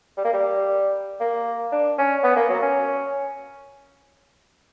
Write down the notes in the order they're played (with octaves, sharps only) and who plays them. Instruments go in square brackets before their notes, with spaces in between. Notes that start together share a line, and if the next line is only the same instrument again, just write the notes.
[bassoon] G3
A#3
G3
A#3
D4
C#4
B3
A#3
F#3
C#4